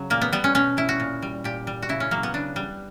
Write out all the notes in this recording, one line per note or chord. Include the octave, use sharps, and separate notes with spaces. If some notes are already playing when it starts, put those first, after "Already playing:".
Already playing: C#3 F#3
A#2 A#3
B3
G3 B3
C#4
B2 C#4
G3 E4
F#4
A#2
G3
A#2 G4
G3
F#4
C#3 E4
C#4
F#3 A#3
B3
C#3 D4
G3